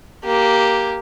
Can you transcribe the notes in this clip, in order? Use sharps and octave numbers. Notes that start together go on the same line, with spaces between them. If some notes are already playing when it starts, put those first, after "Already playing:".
A#3 G4